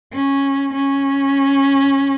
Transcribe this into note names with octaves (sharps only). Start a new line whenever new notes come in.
C#4
C#4